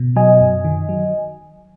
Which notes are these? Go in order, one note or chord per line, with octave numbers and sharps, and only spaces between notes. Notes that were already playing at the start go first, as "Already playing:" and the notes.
Already playing: B2
F#3 D#5 G#5
F#2
D#3
F#3